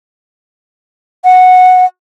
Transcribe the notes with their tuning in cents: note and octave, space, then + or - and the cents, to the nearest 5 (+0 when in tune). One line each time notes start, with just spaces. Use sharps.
F#5 -10